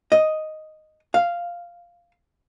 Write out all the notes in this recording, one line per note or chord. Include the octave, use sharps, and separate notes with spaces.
D#5
F5